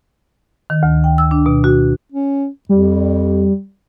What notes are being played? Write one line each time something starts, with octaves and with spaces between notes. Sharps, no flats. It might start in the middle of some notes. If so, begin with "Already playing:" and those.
D#3
D2
G5
E6
D4
B2
F#4
C#4
F2 G3